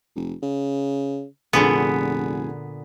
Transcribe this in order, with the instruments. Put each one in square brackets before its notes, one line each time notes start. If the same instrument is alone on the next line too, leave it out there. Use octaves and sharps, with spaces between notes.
[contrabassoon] F1
C#3
[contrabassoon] F1 [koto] A#2 D3 B3 [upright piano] G#4